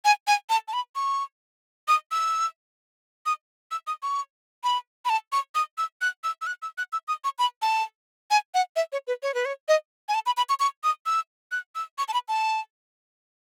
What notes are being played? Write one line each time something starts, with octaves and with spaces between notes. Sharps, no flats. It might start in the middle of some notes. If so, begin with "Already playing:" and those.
G#5
G#5
A5
A5
B5
C#6
D#6
E6
D#6
E6
D#6
C#6
B5
B5
A5
C#6
D#6
E6
F#6
E6
E6
F#6
E6
F#6
E6
D#6
C#6
B5
A5
G#5
F#5
E5
C#5
B4
C#5
B4
C#5
D#5
G#5
A5
B5
B5
C#6
C#6
D#6
E6
F#6
E6
C#6
A5
B5
A5